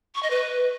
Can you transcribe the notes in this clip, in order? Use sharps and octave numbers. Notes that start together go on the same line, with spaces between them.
C#6
D#5
B4